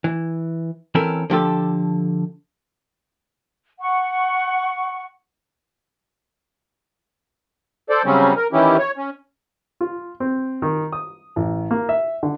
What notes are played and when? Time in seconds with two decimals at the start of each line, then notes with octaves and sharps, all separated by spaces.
0.04 E3
0.95 E3 C4 C#4 A4 A#4
1.30 D3 F3 G4 A4
3.80 F#5 C#6
7.90 A4 C5 D5
8.05 C#3 F#3 G3 C4 C#4
8.36 A#4
8.53 D#3 E3 C#4 E4 G4
8.78 C#5
8.97 C#4
9.81 F4
10.20 C4
10.62 D#3
10.92 D#6
11.36 A1
11.71 A#3
11.89 E5
12.23 D3